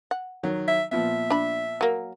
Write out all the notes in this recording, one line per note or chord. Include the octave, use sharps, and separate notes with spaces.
F#5
D#3 F#3
E5
A#2 F3 B3 E5
D4 B5
F#3 A#3